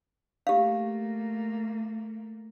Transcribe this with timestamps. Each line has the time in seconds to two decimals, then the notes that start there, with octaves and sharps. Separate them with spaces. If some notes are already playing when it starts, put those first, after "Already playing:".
0.47 A3 A#3 G4 F5